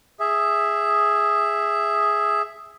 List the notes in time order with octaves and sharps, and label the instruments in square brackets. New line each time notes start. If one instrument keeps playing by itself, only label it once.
[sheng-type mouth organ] G#4 E5